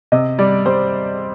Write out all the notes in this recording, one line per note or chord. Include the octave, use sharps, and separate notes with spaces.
C3 D#5
G3 D5
G3 C5